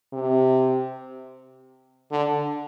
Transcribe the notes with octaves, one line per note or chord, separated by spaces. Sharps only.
C3
D3